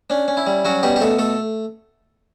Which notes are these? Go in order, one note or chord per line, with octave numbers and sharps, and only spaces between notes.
C#4 D4
C#4
E4
G3
F#3 C#4 F#4
B2 G3 G4
G4
B2 A3 A4
A3 A4